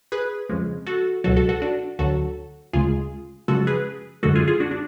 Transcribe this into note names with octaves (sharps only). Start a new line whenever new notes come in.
G#4 B4
F2 C#3 F3 G#3
F#4 A4
C#2 B2 F#3 F#4 A4
F#4 A4
F#4 A4
D4 F#4
D2 D3 F#3 F#4 A4
D2 C#3 G#3 F4 G#4
F#2 C#3 F3 G#3 F#4 A4
G#4 B4
F#2 D3 G#3 F#4 A4
F4 G#4
F4 G#4
D4 F#4
D4